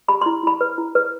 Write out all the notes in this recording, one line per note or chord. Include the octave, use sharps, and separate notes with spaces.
G4 B5
E4 C6
E4 B5
B4
E4
B4